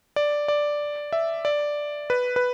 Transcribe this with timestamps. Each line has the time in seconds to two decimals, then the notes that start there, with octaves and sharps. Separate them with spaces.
0.16 D5
0.48 D5
1.13 E5
1.45 D5
2.10 B4
2.36 B4